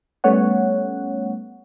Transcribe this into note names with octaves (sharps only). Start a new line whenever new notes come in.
G3 A3 B3 C#4 C#5 F#5